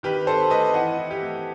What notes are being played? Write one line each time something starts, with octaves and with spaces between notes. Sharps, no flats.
D#3 G4 B4
C4 A4 C5
A3 B4 D#5
E3 D#5 F#5
E4
G4
A3